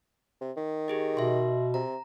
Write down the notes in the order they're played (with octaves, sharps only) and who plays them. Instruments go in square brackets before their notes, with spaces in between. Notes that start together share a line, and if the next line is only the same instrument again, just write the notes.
[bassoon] C3
D#3
[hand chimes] G4 G#4 D#5
[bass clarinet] B2 [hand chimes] E5 C6
[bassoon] C3 [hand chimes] A#5